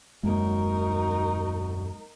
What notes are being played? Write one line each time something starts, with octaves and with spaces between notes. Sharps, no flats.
D#1 F#2 F#3 G#3 A#3 D#4 F#4 A#4